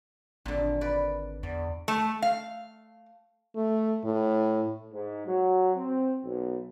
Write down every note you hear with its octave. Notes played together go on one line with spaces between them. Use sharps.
G#1 A#2 D3
B4 D5
E2 D5
A3
F5
A3
A2
G#2
F#3
C4
B1